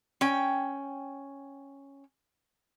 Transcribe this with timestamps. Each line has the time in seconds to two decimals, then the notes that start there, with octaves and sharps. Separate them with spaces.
0.21 C#4 G5